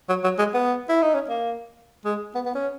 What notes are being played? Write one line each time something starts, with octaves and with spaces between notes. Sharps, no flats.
F#3
F#3
G#3
B3
E4
D#4
C#4
A#3
G#3
B3
B3
C#4